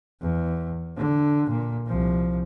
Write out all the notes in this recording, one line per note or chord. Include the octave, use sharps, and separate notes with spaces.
E2
D3
A#2
C2 F3